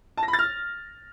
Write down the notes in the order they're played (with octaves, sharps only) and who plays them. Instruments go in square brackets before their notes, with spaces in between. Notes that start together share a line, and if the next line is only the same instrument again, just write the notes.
[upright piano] A5
A#6
B5
A6
F6